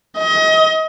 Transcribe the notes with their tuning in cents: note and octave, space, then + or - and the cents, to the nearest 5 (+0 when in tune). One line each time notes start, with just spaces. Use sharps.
D#5 +30